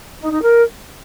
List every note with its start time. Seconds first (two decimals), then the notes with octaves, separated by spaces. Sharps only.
0.21 D#4
0.31 D#4
0.42 A#4